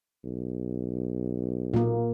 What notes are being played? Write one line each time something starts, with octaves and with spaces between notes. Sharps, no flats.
B1
A#2 A#3